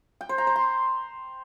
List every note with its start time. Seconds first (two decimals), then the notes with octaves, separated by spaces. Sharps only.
0.21 G5
0.29 C5
0.38 A#5
0.47 C5
0.56 C6